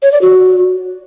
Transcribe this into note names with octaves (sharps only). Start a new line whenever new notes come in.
C#5
D5
F#4